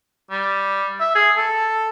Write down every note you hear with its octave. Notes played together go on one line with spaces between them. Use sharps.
G3
E5
G#4
A4